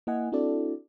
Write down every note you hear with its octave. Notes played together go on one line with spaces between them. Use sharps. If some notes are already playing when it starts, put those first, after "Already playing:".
A#3 E4 D#5 F#5 G#5
C4 D4 E4 F#4 A4 D5